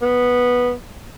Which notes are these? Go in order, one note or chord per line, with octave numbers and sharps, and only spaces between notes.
B3